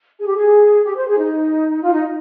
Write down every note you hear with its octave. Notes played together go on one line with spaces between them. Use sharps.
G#4
G4
G#4
G4
C5
G#4
D#4
F4
D#4